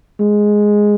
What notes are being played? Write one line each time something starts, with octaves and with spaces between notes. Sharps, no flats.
G#3